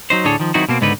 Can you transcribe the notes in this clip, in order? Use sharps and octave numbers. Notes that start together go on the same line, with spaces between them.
F#3 D#4 C5
D2 A2 D4 G#4 A4 C#5
D#3 F3
D#3 F#3 C4 D#4 E4 F#4
B2 A#3 C4
C#2 G#2 D3 B3 D#4 B4